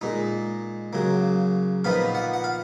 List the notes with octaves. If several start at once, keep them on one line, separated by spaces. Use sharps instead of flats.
A#2 G#3 D#4
C#3 F#3 A#3
A#2 F3 B3 D#4 F5
F#5
F#5
F5